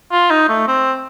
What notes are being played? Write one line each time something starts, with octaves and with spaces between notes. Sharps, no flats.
F4
D#4
A3
C4